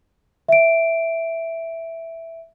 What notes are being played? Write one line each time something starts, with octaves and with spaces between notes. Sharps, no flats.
E5 D7